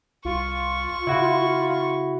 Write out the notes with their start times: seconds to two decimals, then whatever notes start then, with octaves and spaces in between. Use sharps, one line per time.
0.25 C2 F4 C#6
1.07 C#3 E4 F#4